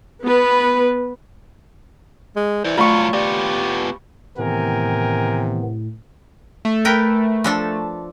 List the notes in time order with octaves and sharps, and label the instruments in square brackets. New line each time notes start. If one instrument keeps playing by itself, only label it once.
[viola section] B3 B4
[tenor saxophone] G#3
[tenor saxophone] E3 [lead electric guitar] C5 D5
[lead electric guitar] G2 F#3 [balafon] A3 D5 [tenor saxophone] F4 [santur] B5 C#6
[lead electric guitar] B3 F4 [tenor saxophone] G4 [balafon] D5
[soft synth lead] A2 [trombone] C3 [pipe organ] D#3 E3 B3 [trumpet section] A#4 G5 G#5
[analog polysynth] A3
[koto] A#4 B4 G5
F3 D4 A4